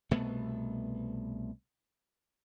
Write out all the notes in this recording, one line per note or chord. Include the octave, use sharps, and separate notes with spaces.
C2 B2 A3 B3